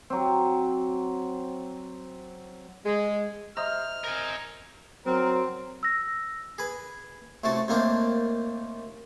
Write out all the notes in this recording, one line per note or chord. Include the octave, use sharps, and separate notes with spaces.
F#3 C4
G#3
C5 D#5 E5 A#5 F6
A#4 G#5
F#3 C4 A#4
E6 A#6
G#4 B4
A1 C3 A3 F#4 A5
D#2 A3 A#3 C4 D4